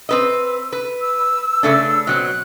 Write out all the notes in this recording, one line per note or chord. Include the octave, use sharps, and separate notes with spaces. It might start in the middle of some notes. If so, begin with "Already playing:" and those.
C4 B4 D#5 E6
B4
E6
C#3 A3 D4
B2 F#3 C4 F#6